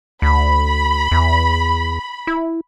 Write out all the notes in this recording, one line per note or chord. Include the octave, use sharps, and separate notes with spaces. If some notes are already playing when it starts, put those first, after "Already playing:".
D2 B5
E2
E4